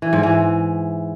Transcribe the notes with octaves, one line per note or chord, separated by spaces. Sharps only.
E3
G#2
E3